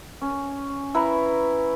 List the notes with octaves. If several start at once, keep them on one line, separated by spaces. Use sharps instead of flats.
C#4
E4 B4 A#5